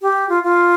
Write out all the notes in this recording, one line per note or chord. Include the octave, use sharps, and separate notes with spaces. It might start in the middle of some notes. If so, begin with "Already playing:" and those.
G4
F4
F4